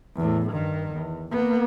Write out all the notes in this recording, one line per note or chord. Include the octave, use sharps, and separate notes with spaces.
E2 A2
G2 D#3
E2
A#3 B3